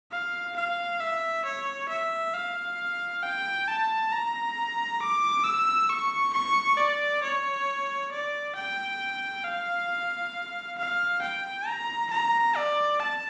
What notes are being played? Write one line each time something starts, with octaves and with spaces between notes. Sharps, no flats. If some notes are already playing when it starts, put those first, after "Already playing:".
F5
F5
E5
C#5
E5
F5
G5
A5
A#5
D6
E6
C#6
C#6
D5
C#5
D5
G5
F5
F5
G5
A#5
A#5
D5
A5